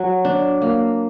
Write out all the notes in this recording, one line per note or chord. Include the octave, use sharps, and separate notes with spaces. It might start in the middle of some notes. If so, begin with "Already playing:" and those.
Already playing: F#3
D4
A#3